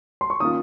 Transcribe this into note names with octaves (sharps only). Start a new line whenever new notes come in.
C6
C#6
D#3 A#3 C#4 F4 D#6